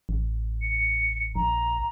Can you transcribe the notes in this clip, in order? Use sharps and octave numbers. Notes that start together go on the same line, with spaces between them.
A1
C#7
A#1 A#5